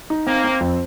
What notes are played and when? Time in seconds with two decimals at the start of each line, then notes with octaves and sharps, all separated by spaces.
0.10 D#4
0.27 A#3 C4
0.44 C4
0.61 F2